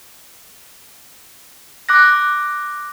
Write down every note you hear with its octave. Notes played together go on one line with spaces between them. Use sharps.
D6 F#6 A#6